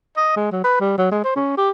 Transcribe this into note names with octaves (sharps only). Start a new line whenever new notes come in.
D#5
G#3
F#3
B4
G3
F#3
G#3
C5
C#4
G4